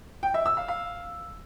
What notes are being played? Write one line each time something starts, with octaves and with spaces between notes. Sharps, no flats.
G5
E5
E6
F5
F5